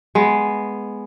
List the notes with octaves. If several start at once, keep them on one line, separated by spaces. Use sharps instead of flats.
G#3 B3